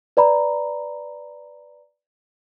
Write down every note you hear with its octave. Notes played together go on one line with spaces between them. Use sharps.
B4 D5 A#5 B5